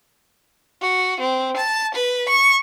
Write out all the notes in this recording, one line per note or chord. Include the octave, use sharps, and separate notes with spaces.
F#4
C4
A5
B4
C#6